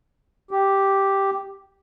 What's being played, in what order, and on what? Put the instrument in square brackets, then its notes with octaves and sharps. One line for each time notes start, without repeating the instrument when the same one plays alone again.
[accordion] G4